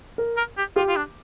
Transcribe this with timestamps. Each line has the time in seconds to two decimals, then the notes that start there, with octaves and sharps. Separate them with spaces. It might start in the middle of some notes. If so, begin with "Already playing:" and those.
0.18 A#4
0.37 A#4
0.57 G4
0.76 F4 G4
0.88 F4
0.96 D4